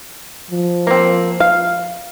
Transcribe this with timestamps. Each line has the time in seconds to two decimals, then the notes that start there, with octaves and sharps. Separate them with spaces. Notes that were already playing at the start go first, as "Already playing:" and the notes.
0.51 F3
0.87 A#3 C4
1.40 F5